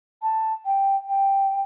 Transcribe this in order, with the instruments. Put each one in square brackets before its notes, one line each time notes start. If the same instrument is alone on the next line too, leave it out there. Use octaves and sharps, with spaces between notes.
[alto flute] A5
G5
G5